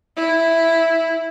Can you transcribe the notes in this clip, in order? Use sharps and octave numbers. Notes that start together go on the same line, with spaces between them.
E4